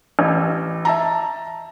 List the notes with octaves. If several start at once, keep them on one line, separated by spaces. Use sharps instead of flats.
A1
E5 A5 A#5